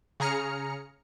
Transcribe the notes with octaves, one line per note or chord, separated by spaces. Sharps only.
C#3 G#4 A#5 F6 C#7